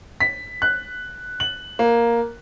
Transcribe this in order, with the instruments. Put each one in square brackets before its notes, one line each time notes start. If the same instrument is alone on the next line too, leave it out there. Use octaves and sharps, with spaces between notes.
[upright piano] B6
F#6
F#7
A#3